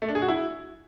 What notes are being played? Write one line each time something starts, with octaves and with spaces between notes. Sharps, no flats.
A3
D4
G#4
F#4
E4